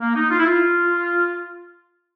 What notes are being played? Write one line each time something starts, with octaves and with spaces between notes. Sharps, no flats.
A#3
D#4
F4
E4
F4